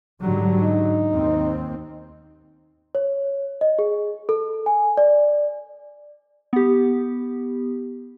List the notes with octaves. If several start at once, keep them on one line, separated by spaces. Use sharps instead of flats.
G#2 D3 F#3 G3
D#4
D#2 C4
C#5
D#5
G#4
A4
G#5
D5
B3 G4